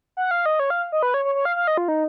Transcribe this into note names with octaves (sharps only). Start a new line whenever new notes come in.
F#5
F5
D#5
C#5
F5
D#5
B4
C#5
C#5
C#5
F5
F5
D#5
F4
D#4